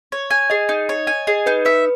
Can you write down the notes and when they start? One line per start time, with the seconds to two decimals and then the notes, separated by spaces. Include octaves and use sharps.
0.12 C#5
0.30 G#5
0.50 G#4 D#5
0.69 D#4
0.89 C#5
1.07 G#5
1.27 G#4 D#5
1.46 D#4 B4
1.65 B4 E5